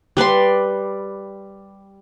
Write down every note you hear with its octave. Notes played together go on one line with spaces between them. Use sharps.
G3 B4 D5 C6